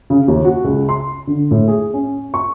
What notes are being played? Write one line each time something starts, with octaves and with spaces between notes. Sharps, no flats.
C#3
D#2
F#4
C#2
C6
D3
A2
G#4
C#4
C#6